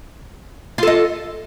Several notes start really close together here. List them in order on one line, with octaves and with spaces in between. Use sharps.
F4 A4 D#5